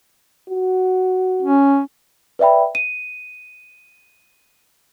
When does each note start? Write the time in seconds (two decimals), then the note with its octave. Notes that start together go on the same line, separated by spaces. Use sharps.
0.50 F#4
1.42 C#4
2.39 B4 D5 E5 G5 B5
2.75 D#7